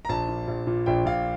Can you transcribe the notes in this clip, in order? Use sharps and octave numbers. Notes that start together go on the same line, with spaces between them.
A#5
A#1 A5
A#2
A#1
A#2
A#1 G5
A#1 F5